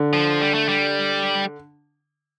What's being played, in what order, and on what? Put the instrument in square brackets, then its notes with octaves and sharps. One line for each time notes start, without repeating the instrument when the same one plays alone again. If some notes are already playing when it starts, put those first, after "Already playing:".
Already playing: [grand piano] D3
[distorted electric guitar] F3
G3
A3
G3